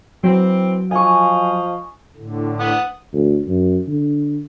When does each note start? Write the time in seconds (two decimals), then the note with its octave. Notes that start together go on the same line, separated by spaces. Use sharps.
0.24 E3 F#3 C4
0.91 F3 D#5 F5 G#5 C#6
2.16 A2 D3
2.60 F#5 D#6
3.13 D2
3.48 F#2
3.88 D3